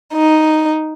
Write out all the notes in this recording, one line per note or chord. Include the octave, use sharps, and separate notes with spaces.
D#4